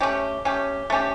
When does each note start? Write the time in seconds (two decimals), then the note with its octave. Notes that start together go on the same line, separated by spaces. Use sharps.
0.01 A3 C#4 G4
0.45 A3 C#4 G4
0.90 A3 C#4 G4